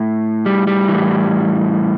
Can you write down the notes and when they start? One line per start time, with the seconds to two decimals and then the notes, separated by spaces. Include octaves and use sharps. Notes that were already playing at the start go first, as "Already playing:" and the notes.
Already playing: A2
0.46 G3
0.67 G3
0.88 A2 E3